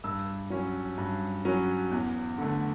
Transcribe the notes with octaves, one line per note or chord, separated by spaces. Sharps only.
G2 E6
F#3 C#4
G2
F#3 C#4
E2
D3 A3